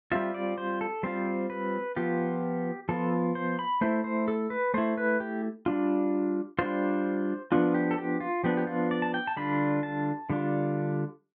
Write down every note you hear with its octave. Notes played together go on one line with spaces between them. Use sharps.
G3 C4 F4 E5
D5
C5
A4
G3 C4 F4 C5
B4
F3 B3 F4 G4
F3 B3 F4 A4
C5
B5
A3 E4 C5
C5
A4
B4
A3 E4 C5
B4
G4
G3 D4 F4
G3 D4 F4 C5
F3 B3 D4 F4
G4
A4
G4
F4
F3 B3 D4 G4
G4
F4
D5
A5
G5
A5
D3 G3 D4 F4 B5
A5
D3 G3 D4 F4